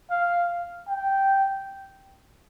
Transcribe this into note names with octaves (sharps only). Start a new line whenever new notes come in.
F5
G5